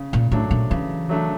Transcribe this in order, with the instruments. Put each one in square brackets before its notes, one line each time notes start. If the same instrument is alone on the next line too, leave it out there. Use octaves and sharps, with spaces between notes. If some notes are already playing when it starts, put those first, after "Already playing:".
Already playing: [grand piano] C#3
[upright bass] A#2
[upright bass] A2 [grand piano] F#3 A3 D4
[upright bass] A#2
[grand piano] C#3 [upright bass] E3
[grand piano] F#3 A3 D4